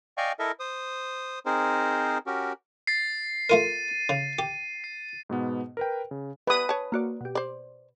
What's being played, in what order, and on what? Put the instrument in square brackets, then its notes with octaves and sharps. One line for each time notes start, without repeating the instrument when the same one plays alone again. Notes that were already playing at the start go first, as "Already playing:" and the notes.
[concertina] D5 D#5 F5 G5 G#5 C#6
E4 A4 A#4 D#5 E5
C5 D#6
C4 D#4 G#4 A#4 C5
C#4 F#4 G4 A#4
[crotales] A6 C7
[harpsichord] A3 F4 A#4 [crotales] D#7
[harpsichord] C#3
G4
[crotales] C7
[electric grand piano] G#2 B2 B3
A#4 B4 G5
C#3
[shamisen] G3 B3 [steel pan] B4 D#6
[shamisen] C#5 A5
[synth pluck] A#3 F#4 D5
B2 G4
[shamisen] C5 D5